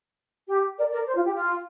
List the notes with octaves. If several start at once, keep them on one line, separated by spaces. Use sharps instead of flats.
G4
A#4 D5
A#4 D5
C5
F4
G4
F4